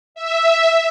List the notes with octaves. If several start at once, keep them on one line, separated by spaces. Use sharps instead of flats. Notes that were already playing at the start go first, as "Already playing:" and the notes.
E5